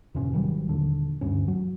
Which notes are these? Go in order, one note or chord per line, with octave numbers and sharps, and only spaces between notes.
F2 G#2 C3 C#4
G#1 D#3 F#3 G3
A#1 D#2 D3
D2 G2 C#4
F#3